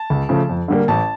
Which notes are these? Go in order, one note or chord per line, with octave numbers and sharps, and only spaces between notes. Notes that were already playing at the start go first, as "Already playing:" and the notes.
Already playing: A5
C#2
C#3 F3 A3
F2
D3 G3 A#3
A1 A5